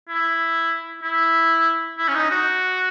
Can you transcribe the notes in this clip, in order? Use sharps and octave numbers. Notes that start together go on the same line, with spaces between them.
E4
E4
E4
C#4
D#4
F#4